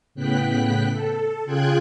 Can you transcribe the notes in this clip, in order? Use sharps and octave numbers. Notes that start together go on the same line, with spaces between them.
A2 C#3 B3 G5 F#6 B6
A4
C#3 F4 G#4 G5 F#6 G#6